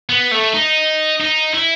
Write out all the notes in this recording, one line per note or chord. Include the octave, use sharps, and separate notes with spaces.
B3
A3
D#4
D#4
E4